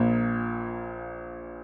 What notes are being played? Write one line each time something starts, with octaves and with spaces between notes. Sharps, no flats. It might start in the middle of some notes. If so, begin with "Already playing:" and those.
Already playing: A#1 A#2 A#3